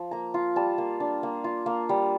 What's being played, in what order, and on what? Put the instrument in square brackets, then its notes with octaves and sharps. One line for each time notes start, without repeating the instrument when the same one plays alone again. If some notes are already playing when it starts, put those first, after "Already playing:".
Already playing: [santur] F3
A#3 A#5
F4
G3 A5
A#3
D4
A#3
F4
A#3
G3